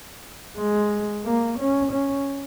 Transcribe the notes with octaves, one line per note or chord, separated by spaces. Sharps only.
G#3
A#3
C#4
C#4